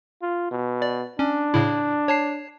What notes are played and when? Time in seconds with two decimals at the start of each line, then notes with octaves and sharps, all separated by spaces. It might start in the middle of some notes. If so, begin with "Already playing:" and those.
0.22 F4
0.51 B2
0.82 D5
1.19 C#4 D4
1.54 A2 C#3 E4
2.08 C#5 A5 C7